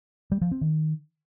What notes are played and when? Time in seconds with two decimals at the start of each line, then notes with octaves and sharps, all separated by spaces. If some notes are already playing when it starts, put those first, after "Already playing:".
0.32 G3
0.41 F3
0.51 C4
0.61 D#3